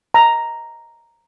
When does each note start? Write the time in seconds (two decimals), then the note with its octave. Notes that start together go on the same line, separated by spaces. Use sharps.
0.14 A#5